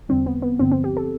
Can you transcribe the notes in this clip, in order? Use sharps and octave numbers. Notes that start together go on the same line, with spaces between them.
E2 D3 G3 C4
B3
B3
G2 D3 F3 C4
C4
G4
A4